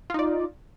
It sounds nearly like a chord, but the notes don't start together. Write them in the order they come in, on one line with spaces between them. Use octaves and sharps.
F4 D#4 D5